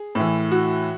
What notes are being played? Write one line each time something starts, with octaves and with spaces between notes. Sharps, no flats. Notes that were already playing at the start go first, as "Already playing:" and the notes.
Already playing: G#4
A2 E3
F#4